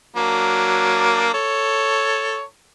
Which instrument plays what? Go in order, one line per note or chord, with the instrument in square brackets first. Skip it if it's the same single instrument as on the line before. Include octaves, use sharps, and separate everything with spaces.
[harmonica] F#3 A#3 D4
A4 C#5